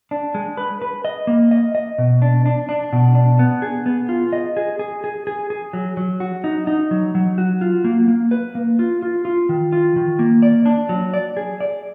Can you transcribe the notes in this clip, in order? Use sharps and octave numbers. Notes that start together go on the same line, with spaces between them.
D4
G#3
B4
B4
D#5
A#3
D#5
D#5
B2
D4
D4
D4
B2
D4
B3
G#4
B3
F4
D#5
G#4
G#4
G#4
G#4
G#4
F#3
F#3
F#4
D#4
D#4
F#3
F#3
F#4
F4
A#3
A#3
B4
A#3
F4
F4
F4
D#3
F4
D#3
A#3
D5
D4
F#3
D5
G#4
D5